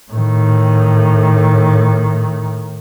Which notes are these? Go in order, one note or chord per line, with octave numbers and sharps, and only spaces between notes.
A2 D#3